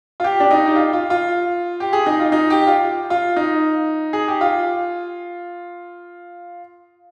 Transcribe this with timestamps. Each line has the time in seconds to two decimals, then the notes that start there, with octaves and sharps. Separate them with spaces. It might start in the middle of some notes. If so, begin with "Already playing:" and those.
0.20 F4
0.24 G4
0.40 D4
0.51 D#4
0.65 G4
0.76 F4
0.93 F4
1.10 F4
1.80 G4
1.93 G#4
2.06 D#4
2.20 F4
2.32 D#4
2.50 G4
2.67 F4
3.10 F4
3.36 D#4
4.13 G#4
4.28 G4
4.41 F4